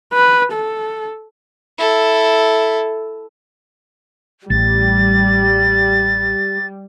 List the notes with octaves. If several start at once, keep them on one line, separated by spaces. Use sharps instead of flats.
B4
A4
E4 A4
A1 G3 A6